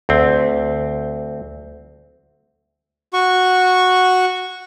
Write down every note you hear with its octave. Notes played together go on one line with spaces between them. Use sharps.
D2 C4
F#4 C#6